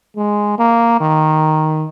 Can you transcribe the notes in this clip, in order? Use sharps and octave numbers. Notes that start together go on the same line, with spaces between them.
G#3
A#3
D#3